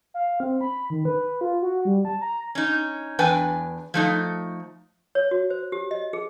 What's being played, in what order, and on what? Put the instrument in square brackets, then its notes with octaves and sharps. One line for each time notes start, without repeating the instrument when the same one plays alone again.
[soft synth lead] F5
C4
B5
D#3
B4
F4
F#4
G3
A5
A#5
[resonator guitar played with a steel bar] C#4 D#4
E2 D4 B4 G5 G#5
F3 A3 D#4
[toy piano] C#5
F#4
C5
G4
D#5
G#4